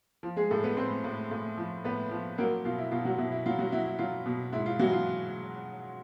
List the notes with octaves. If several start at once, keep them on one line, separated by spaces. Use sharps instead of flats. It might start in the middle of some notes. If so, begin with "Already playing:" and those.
F3
G#3 G#4
A2 A3 A4
B3 B4
A2 C4 C5
A2
A2
F3
A2 B3 B4
F3
F#3 A#3 A#4
B2 F4
E4
B2 F4
F#3 F#4
B2 E4
E4
F#3 F4
F#3 F#4
F#3 E4
E4
F#3 F4
B2
G#2 E4
F4
E3 F#3 F#4
F4